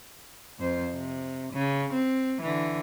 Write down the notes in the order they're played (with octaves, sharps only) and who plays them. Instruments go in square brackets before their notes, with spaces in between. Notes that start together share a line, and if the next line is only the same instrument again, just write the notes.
[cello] F2 C5
C3
C#3
C4
D3 E3